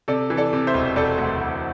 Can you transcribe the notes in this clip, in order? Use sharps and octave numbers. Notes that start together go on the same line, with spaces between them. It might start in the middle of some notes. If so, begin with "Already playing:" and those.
C3 A4 D5
E3
A4 D5
C3
C5 E5
E1
E1 A4 D5
D2
E1